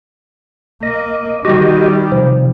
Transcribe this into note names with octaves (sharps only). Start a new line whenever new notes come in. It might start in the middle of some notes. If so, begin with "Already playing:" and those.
A#3 D#5
D#3 G3 F#4 G4 D#5
C3 F3